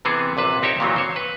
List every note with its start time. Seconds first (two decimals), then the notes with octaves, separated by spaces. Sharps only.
0.05 C3 E3 B3 C4 G#4 A4
0.37 A#1 C3 B4 A5
0.62 C4 D#4 G4 C#5 E5
0.80 A#2 D#3 E3 F#3 C4 D#4
0.96 C5 C#5
1.16 B4